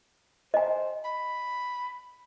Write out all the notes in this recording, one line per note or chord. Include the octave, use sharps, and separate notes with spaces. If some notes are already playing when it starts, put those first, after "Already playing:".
C5 D#5 G#5
B5